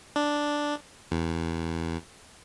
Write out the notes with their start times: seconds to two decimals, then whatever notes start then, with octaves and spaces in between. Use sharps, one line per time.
0.16 D4
1.12 E2